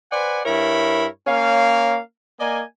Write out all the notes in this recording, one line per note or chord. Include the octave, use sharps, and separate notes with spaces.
B4 C5 D5 F#5 G#5
G2 E4 A#4 C#5 B5
A#3 C#4 C#5 F5
A#3 D5 D#5 G#5